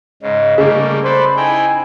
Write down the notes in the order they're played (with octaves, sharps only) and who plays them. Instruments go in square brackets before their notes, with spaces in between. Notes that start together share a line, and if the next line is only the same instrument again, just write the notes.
[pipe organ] G#2 C#3 [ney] D#5
[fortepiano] C#3 [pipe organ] G3 A3 A#3
[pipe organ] A4 B4 D5 [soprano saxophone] C5 [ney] B5
[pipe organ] D#4 E4 G5 [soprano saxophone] G#5